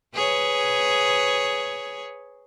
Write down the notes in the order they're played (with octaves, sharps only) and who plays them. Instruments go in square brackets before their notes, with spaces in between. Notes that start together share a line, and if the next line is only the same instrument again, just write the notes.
[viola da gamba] G#4 B4 C#5